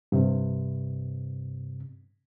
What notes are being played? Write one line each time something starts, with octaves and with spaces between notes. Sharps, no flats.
G2 C3